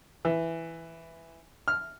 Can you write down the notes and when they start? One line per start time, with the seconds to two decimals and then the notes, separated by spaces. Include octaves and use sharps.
0.25 E3
1.68 F6